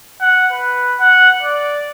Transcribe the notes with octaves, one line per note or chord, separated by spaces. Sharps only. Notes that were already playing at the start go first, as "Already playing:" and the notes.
F#5
B4
F#5
D5